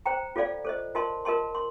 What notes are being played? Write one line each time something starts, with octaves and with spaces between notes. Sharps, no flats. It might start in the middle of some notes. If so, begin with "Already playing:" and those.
C5 G5 A#5
F4 A4 D5 F5
A4 C5 D#5
F4 A#4 D#5 A5 C6
F4 A#4 D#5 A5 C6
C6